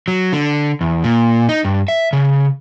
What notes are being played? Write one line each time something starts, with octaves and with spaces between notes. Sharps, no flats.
F#3
D3
E2
A#2
D#4
G2
E5
C#3